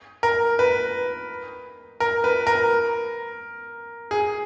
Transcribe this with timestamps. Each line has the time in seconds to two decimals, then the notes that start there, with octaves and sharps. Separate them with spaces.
0.23 A#4
0.59 B4
2.00 A#4
2.24 B4
2.47 A#4
4.11 G#4